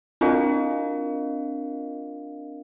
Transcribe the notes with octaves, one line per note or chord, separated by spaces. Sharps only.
C4 D4 F4 A#4 D#5 F5